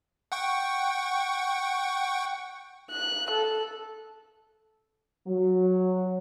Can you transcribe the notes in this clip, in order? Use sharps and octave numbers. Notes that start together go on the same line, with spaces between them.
F#5 G5 C#6
F#6
A4
F#3